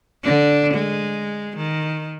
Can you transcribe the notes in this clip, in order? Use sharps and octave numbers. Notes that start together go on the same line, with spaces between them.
D3 D4
G#3
D#3